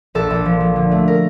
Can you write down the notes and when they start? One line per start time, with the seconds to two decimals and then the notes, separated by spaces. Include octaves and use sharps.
0.15 A#1 A4
0.30 A#1
0.46 F3
0.60 F3
0.76 D3
0.91 A3
1.08 A#4